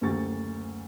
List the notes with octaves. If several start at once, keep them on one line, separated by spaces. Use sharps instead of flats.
F#1 D2 C#3 G4 C#6 A6